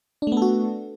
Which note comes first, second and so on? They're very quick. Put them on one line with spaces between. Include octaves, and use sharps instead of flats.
D4 A3 B3 A4 F#4